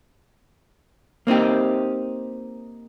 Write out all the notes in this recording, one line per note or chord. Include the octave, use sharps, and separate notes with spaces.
A#3 C4 D#4 G4